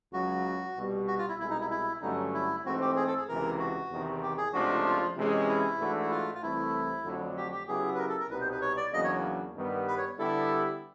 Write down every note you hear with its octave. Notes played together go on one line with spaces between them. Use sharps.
C#2 C#3 F#3 F#4
C2 B2 G3 B3
F#4
F4
E4
C2 B2 G#3 E4
D#4
E4
E4
G2 D3 F#3 A3 C#4 D#4
E4
G#2 E3 A3 C4 F#4
G4
G#4
A4
G#4
C#2 C3 E3 A#4
F#4
E2 C3 D#3
G4
G#4
C#2 C3 F3 A3 D4 F#4
F4
C3 E3 G#3 C#4
E4
G#2 E3 A3 D4 F#4
E4
F4
F4
C2 C3 E3 A3 E4
F2 D3 F#3 A3 D4
G4
G4
C#3 F#3 B3 E4 G4 G#4
B4
A#4
A4
A#4
C2 B2 G3 B3 D#4 B4
C5
B4
C#5
D5
E2 C#3 F#3 A#3 D4 D#5
C#5
G2 D#3 G3 B3
B4
C#5
D3 G3 B3 E4 G4 A4